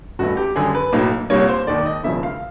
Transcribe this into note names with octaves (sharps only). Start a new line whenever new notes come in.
A1 G2 E3 A3 F#4
G4
F#2 D3 G3 G#4
B4
B1 A2 F#3 A#3
C2 A#2 G3 A#3 C#5
C5
E1 D#2 D#3 D5
D#5
E1 E2 C#3 F3 E5
F5